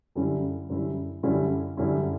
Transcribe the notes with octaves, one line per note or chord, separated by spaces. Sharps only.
F#2 D3 G3 C#4 E4
F#2 D3 G3 C#4 E4
F#2 D3 G3 C#4 E4
F#2 D3 G3 C#4 E4